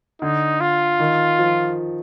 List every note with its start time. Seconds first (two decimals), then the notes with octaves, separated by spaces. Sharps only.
0.22 D3 D#4
0.61 F4
1.00 D#3
1.39 F3